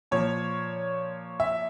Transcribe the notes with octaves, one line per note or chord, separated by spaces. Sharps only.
A#2 F3 C#5
E5